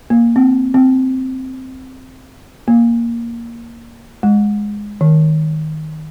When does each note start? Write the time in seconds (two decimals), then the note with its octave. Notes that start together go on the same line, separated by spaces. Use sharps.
0.10 A#3
0.36 C4
0.74 C4
2.68 A#3
4.23 G#3
5.01 D#3